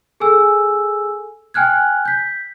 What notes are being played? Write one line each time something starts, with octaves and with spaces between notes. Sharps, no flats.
G#4 A4 G#5 E6
G5 G#5 F6 F#6 G#6
G6 B6